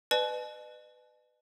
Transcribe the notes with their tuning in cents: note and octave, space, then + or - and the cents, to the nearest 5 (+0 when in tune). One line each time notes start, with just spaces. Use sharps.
B4 +15 D#5 -45 A5 -40